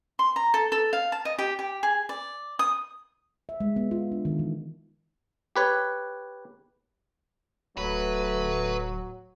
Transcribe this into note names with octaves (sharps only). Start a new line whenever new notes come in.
C6
A#5
A4
A4
F5
A5
D#5
G4
G4
G#4
D5
D#6
E5
G#3
B3
F4
D4
D#3
E3
G4 B4 C#5
D1 F#3 A3 B4